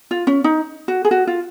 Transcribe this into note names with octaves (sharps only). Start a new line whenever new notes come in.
F4
C#4
D#4
F#4
G#4
F#4
F4